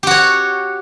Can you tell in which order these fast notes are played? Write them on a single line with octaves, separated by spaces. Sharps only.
G4 F#4 C#5